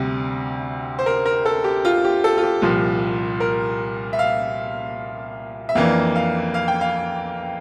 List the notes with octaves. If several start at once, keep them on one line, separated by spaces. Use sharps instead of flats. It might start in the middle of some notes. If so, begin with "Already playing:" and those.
Already playing: D2 C3 G3 D4
C5
A#4
A#4
A4
G4
F4
G4
A4
F4
G4
C2 A#2 F3
A#4
E5
F5
E5
F2 E3 A#3 D4 F5
F5
F5
G5
F5